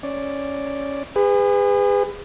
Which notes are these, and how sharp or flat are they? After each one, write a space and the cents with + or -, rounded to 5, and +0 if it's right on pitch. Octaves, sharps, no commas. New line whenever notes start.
C#4 +0 D5 +0
G#4 -35 B4 +25